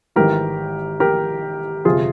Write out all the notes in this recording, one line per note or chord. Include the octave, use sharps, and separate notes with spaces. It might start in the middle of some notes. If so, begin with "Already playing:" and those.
G#1 G#2 E3 G4 A#4
G4 A#4
G1 F2 C3 F3 F4 G#4